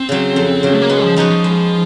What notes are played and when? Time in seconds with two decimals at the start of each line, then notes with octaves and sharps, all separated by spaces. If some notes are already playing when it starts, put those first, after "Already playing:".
Already playing: C4
0.09 C#3 F#3
0.36 F2
0.63 C#3 F#3
0.73 A3
0.82 A#3
0.89 G#3 B3
1.03 F3
1.16 F3 B3 D#4 F#4
1.30 F3
1.44 G#3